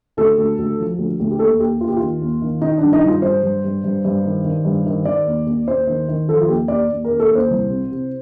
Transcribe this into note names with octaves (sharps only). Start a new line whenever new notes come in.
D2 A4
D2
D2
F3
D2
D2
G4
D#2 A4
D#2 G4
D#2 F4
G4
D#3 F4
D#2
D#3
D#3 D#4
D4
G2
D#4
G2 F4
G2 C5
G2
G2
G2
G2
D#3
D#3
G2
D#3
D#3 D5
D#2
D#2
D#2 C5
D#3
D#3
F3 A4
F4
D#2 G4
D#2 D5
D#2
D#2 A#4
A4
D#2 C5
C2
C3
C3